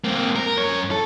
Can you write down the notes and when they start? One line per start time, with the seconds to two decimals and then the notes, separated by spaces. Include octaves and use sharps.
0.04 A#3 C4
0.36 A#4
0.57 F#2 C#5
0.91 A4